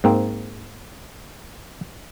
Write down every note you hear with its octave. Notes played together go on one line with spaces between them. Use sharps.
G#2 A#3 C4